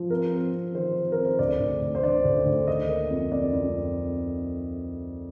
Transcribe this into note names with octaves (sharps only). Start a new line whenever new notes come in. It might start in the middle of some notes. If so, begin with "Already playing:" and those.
Already playing: F3
C4 A#4
C4
C4
D#3 C5
D#3
A#4
C4
C5
D2 D5
D2
D2
C5
D3 D5
D2
D2
D#3 D#5
A#3
F2
F2 D5
F2